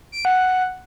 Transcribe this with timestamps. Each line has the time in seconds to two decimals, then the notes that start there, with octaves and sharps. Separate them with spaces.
0.12 D7
0.25 F#5